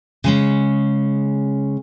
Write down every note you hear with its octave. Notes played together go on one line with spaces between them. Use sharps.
C#3 G#3 C#4